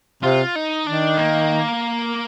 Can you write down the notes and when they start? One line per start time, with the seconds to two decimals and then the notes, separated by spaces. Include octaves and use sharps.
0.23 C3 F4
0.56 D#4
0.87 D#3 D4
1.19 A#3